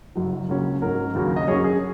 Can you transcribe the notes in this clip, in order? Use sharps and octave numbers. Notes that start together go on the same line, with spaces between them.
F#1 F#2 F#3
C#2 C#3 F#3 A#3 C#4
G#2 F#3 C#4 A#4
D#2 C#3 F#3 A#3 C#4
D#5
F#2 F#3 C#4 G#4 C#5
G#4